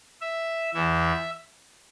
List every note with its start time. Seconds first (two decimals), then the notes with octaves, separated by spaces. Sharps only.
0.21 E5
0.74 E2 E3 E5